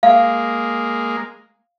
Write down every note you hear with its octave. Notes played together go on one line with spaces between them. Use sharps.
G#3 A#3 F5